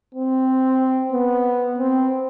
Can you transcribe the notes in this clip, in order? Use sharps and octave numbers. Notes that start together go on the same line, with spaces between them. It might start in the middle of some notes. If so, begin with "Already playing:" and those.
C4
B3
C4